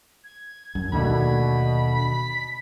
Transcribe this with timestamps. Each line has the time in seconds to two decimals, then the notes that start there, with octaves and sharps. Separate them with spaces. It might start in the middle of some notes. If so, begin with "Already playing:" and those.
0.24 G#6
0.75 F#2
0.92 D#2 B2 D3 A3 B5
1.95 B6